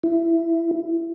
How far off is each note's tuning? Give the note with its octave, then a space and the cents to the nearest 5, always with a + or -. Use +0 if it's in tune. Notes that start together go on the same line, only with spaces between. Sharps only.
E4 +15